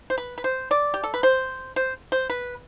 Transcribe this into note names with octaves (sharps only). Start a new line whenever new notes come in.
C5
B4
B4
C5
D5
G4
A4
B4
C5
C5
C5
B4